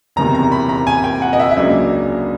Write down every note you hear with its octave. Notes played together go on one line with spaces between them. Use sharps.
F#1 E2 C3 D#3 A#5
A#5
B5
A#5
G#5
G5
F#5
D#5
E5
E5
C#2 C#3 F#3 A#3 D4 D#5